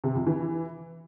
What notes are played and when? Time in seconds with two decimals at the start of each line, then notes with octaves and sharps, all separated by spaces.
0.04 C3
0.15 F2
0.27 E3